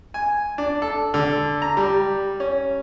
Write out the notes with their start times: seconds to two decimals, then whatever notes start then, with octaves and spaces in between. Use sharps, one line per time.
0.14 G#5
0.58 D4
0.82 A4
1.14 D3
1.62 A#5
1.77 G3
2.40 C#4